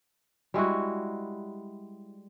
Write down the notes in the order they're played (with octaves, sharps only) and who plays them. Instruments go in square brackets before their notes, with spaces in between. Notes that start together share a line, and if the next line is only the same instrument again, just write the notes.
[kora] G3 G#3 E4 F#4